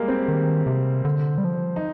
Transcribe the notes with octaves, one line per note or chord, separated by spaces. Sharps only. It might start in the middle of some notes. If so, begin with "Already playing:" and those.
Already playing: G3 G#3 A#3
C4
D#3
C3
D3
G3
F3
D#4